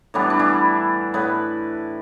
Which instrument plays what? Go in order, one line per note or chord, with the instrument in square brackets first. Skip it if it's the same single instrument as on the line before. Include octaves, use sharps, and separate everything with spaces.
[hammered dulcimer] A2 E3 G3 B3 D4
D4
E3 E4
A2 B3 B4